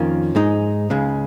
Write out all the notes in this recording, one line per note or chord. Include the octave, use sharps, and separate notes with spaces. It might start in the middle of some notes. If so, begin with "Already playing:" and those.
Already playing: F2 D#3 A#3 C#4 F4
G#2 G#3 D#4
C#2 C#3 G#3